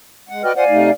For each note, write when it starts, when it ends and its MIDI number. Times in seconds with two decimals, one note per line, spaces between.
0.29 0.43 56
0.29 0.43 78
0.43 0.51 66
0.43 0.53 71
0.43 0.53 74
0.43 0.53 75
0.43 0.51 79
0.43 0.51 89
0.56 0.64 65
0.56 0.64 72
0.56 0.91 74
0.56 0.91 77
0.56 0.64 78
0.56 0.91 80
0.69 0.90 48
0.69 0.90 57
0.69 0.90 63